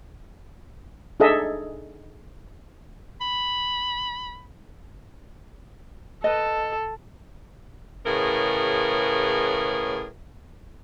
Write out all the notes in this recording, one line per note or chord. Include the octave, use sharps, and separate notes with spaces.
D4 D#4 G#4 A4 D#5 E5
B5
A4 B4 D#5
A2 C#3 G#4 A#4 B4